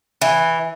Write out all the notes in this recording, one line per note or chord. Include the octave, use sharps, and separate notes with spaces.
E3